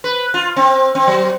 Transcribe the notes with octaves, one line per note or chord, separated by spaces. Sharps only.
B4
F4
C4
C4
F#3